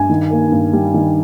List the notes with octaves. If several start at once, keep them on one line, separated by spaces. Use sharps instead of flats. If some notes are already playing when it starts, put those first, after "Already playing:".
Already playing: G2 G#5
D#3
A#3
G2
G3
D#3